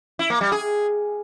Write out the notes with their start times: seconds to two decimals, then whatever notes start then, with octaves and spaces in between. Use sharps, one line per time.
0.19 E4
0.30 A#3
0.41 G3
0.52 G#4